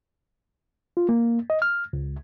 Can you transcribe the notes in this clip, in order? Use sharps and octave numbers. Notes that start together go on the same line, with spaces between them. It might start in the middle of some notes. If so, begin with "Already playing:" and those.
F4
A#3
D#5
F6
C#2